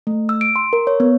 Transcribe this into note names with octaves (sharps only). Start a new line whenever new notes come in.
A3
E6
D7
C6
A#4
C#5
B3